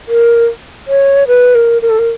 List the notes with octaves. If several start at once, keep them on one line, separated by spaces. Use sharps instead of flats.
A#4
C#5
B4
A#4
A#4
A4
A#4